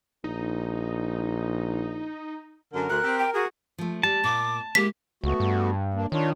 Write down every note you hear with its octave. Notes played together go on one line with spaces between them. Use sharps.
A#1 D#4
F#2 D3 A#4
D2 F#6
C4 G4
G5
F#4 G#4
F3 A3
G3 A5
A#2 D6
G#3 A#3 E4 G4 B6
C#2 A3 B3 F#4
G2
A#3 D4
D#3 D4 F4 C#5